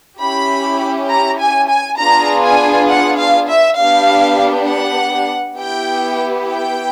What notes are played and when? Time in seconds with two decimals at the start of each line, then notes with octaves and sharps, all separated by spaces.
0.21 C#4 E4 G4 B5
1.09 A#5
1.40 G#5
1.69 G#5
1.99 B3 D4 F4 G#4 A#5
2.44 G#5
2.89 F#5
3.19 F5
3.48 E5
3.78 B3 D4 G4 F5
4.67 F#5
5.56 B3 E4 G4 G5
6.45 G5